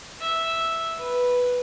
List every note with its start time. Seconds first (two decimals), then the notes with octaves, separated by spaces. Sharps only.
0.21 E5
0.98 B4